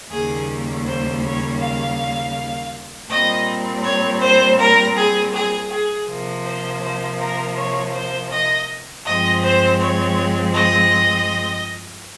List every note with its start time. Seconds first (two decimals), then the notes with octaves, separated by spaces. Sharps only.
0.10 D#2 C#3 G3 A#3 G#4
0.85 C5
1.22 C#5
1.60 F5
3.09 A#2 G3 C4 D#5
3.83 C#5
4.21 C5
4.58 A#4
4.95 G#4
5.33 G#4
5.70 G#4
6.07 C3 F3 A#3
6.44 C5
6.82 C5
7.18 A#4
7.55 C#5
7.93 C5
8.30 D#5
9.05 G2 F3 G#3 C4 D#5
9.43 C5
9.79 C#5
10.54 D#5